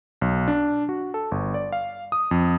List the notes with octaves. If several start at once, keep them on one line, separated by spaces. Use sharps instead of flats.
B1
D4
F#4
A4
G1
D5
F5
D#6
F2